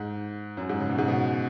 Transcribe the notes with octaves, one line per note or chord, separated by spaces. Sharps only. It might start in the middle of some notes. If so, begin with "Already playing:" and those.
Already playing: G#2
F#2
G#2
C#3
B2
G#2
B2